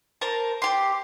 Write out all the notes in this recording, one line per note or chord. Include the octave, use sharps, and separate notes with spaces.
A#4 C5 A5
G4 C6